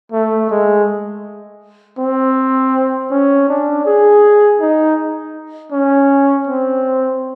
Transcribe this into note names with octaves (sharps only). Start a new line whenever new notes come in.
A3
G#3
C4
C#4
D4
G#4
D#4
C#4
C4